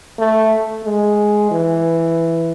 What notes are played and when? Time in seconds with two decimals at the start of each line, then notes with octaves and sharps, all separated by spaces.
0.19 A3
0.84 G#3
1.51 E3